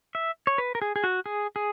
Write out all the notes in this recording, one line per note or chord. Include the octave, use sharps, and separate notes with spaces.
E5
C#5
B4
A#4
G#4
G#4
F#4
G#4
G#4